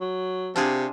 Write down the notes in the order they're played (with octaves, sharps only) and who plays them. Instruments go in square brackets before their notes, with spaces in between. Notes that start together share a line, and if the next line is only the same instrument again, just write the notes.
[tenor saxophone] F#3
[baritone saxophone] C3 [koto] D4 F4 G#4